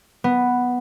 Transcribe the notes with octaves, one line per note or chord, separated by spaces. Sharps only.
B3